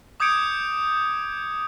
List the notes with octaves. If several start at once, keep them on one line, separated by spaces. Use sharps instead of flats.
D6 D#6 G6 G#6 C#7 D7